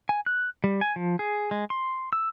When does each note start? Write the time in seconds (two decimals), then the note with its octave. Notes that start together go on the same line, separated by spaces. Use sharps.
0.09 G#5
0.26 F#6
0.64 G3
0.81 G#5
0.96 F3
1.19 G#4
1.51 G#3
1.70 C6
2.13 E6